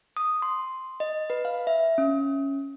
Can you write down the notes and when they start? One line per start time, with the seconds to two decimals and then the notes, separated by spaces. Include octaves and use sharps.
0.17 D#6
0.42 C6
1.00 D#5
1.30 B4
1.45 F5
1.67 E5
1.98 C#4